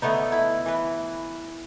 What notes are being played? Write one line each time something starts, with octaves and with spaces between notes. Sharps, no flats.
D3 A3 B3 D#4
E4
E3 B4